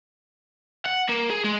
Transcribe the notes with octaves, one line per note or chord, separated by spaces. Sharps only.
F#5
A#3
G#4
G#3